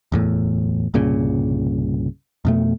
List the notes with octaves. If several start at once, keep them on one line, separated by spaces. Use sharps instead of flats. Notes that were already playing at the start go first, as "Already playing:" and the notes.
D1 E2 A2
C2 G2 A#2 C#3
F2 B2 A3